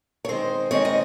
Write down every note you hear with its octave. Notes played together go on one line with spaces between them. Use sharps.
C#5
D#3 G#3 C4 C5
D#3 G#3 C4 C#5
D#5